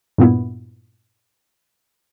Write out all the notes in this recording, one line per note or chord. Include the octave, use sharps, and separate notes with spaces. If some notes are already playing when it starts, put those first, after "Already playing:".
G2 A#2 B3 E4